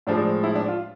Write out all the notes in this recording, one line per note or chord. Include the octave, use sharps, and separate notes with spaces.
A2 F3 G#3 D4
E4
D4
F4